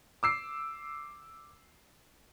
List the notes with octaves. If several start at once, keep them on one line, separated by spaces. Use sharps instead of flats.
D6 E6 C7